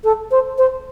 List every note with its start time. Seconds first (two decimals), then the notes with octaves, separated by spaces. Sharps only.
0.04 A4
0.31 C5
0.58 C5